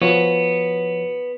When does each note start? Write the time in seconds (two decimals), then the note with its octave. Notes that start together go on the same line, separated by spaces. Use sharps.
0.02 F3 B3 F#4 C#5